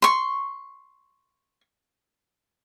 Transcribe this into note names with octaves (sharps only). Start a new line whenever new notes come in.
C6 C#6